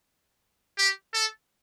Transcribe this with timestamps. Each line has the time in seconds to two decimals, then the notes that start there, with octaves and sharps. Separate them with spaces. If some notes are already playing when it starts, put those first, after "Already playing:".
0.78 G4
1.14 A4